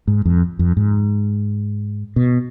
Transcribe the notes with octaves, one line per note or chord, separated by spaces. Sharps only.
G#2
F2
F2
G#2
B2